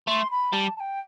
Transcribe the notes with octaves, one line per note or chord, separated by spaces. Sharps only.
A3 C6
B5
G3 A5
A5
G5